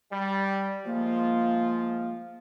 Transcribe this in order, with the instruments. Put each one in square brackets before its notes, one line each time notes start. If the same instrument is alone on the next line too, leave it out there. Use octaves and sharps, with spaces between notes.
[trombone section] G3
[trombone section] F3 G#3 F4 [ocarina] A#3